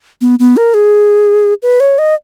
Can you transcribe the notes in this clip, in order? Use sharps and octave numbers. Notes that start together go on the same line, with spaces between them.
B3
B3
A#4
G#4
B4
C#5
D#5